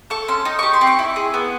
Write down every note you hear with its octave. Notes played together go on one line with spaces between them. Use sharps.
A4 C#6
C#4 C6
D#4
G4 C#6
C6
C4
C#6
E4
G#4
B3